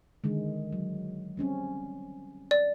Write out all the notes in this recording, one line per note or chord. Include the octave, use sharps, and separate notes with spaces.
D3 D#3 G#3
F#3
G3 C4 C#4
D5